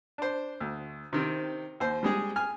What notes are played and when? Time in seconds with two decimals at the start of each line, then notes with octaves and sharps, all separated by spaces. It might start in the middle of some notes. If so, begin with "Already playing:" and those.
0.18 D4 C5
0.60 D2
1.13 C3 D#3 C4
1.80 D#2 C5
2.03 G3 G#3 G#4
2.36 G#5 F6